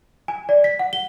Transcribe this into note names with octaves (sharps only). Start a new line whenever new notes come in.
G#5
D5
B6
F#5
G7